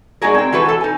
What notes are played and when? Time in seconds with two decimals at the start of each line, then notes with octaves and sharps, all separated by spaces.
0.22 G#3 D4 D#4 F#4 G#4 A#4
0.34 C4 G5
0.53 E3 F#4 A4 B4
0.65 A4 A5
0.81 D#4 G#5